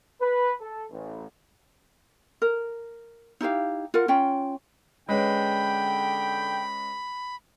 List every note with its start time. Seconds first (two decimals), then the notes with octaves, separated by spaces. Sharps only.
0.21 B4
0.60 A4
0.90 A1
2.42 A#4
3.41 D#4 E4 G4 F5
3.94 F4 A#4 F#5
4.08 C#4 F4 G5
5.09 D3 G#3 C#4 B4 G5 B5